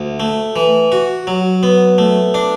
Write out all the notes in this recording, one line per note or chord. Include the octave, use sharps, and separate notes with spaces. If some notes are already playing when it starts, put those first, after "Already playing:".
Already playing: D2
A3
E3
F#4
F#3
B3
A3
D4